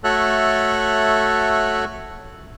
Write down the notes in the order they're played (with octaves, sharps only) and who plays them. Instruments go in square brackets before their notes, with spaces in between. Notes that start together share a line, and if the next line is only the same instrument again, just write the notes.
[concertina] A3 F#4 A4 C#5 E5 F#6